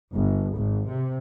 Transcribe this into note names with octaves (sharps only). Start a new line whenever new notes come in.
G1
G#1
C3